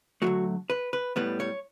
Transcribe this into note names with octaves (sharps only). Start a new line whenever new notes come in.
D3 F#3 A3 F#4
B4
B4
A2 G3 B3 B4
C#5